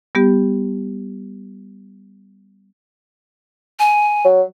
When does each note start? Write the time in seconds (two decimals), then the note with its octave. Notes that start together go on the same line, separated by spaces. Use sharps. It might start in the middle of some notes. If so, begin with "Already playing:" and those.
0.15 G3 B3 G4
3.79 G#5
4.24 F#3